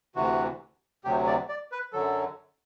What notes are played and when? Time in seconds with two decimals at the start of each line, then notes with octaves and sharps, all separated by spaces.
0.16 D2 C3 E3 F#4
1.05 D2 C3 F#3 G4
1.27 D5
1.49 D5
1.72 B4
1.93 F#2 D3 F#3 A4